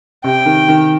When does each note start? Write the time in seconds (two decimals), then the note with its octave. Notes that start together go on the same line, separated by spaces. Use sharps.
0.24 C3 G5
0.46 D#3
0.68 D#3